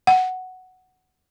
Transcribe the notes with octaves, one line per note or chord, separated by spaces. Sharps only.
F#5